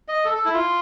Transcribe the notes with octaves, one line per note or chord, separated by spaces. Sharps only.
D#5
A4
A4
E4
F4